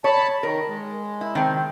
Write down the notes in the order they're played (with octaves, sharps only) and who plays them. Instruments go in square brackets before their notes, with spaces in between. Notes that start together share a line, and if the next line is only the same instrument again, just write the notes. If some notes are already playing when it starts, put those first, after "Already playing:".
[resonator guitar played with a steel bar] C#5 [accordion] A5 B5
[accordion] D#3 [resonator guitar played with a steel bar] A#4
[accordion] G#3
[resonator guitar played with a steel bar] E4
D#3 C4